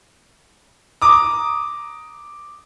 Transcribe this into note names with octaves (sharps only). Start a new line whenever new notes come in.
A#5 D6 D#6